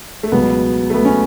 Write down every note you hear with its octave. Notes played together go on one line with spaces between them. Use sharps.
A3
C#2 B2 F#3 B3
A3
B3
C#4